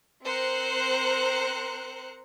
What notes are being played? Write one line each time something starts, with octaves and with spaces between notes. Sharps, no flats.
C4 A#4 C5 F#6 C#7